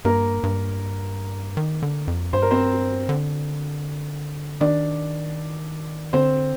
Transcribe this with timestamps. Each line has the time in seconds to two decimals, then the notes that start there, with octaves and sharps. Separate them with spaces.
0.05 G2 A#3 A#4
0.43 G2
1.57 D#3
1.82 D3
2.08 F2
2.33 G2 C5
2.42 A#4
2.51 C4 C5
3.09 D3
4.61 D#3 D4 D5
6.13 D3 C4 C5